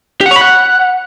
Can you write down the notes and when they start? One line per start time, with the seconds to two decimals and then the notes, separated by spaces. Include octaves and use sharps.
0.21 G4
0.26 F#5
0.31 C#5
0.36 B5
0.41 F#5